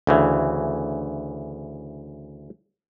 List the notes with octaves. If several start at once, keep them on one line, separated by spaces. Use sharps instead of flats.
D2 C#3 E3